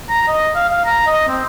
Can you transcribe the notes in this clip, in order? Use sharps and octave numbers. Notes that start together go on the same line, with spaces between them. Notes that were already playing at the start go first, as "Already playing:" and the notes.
A#5
D#5
F5
F5
A#5
D#5
C4